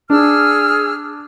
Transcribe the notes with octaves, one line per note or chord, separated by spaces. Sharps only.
D4 G#4 E6 F6